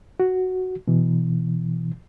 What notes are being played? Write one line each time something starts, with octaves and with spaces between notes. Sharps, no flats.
F#4
B2 E3